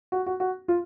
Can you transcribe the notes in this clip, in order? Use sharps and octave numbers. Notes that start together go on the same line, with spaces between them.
F#4
F#4
F#4
F4